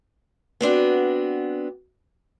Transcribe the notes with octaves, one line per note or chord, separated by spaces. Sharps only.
B3 C4 D4 F#4